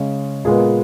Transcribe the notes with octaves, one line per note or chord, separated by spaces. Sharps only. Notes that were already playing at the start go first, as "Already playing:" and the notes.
Already playing: C#3 G#3 C#4
A#2 G#3 B3 G#4